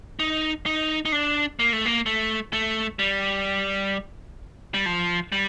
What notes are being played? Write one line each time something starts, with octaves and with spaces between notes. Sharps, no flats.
D#4
D#4
D#4
D4
A#3
A3
A#3
A3
A3
G3
G3
F3
G3